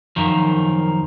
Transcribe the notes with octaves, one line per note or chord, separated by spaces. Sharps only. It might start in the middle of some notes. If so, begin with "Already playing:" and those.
F#2 D#3 F3